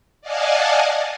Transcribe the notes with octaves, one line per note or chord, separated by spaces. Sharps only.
D5 D#5 F5 F#5 G#5 A5